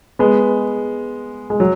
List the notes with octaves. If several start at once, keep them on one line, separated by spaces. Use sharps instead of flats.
G#3 B3
G#3
F#3